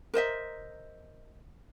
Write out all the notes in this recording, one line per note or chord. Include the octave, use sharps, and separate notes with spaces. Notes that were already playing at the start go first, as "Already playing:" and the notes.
A#4 C5 D#5 E5